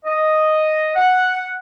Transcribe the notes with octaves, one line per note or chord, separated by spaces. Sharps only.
D#5
F#5